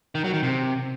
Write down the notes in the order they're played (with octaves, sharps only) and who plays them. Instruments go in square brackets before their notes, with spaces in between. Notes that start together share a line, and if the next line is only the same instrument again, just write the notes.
[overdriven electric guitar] D#3
F#3
D#3
C3